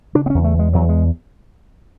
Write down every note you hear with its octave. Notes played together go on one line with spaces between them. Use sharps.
C#3 D4
B3
E2 C#4
A3
E2
G#3
E2 F#3
G#3